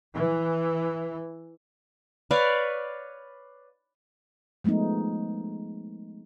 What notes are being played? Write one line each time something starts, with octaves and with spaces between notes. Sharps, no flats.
E3
B4 C#5 D5 F5
F3 G#3 A3 B3 D#4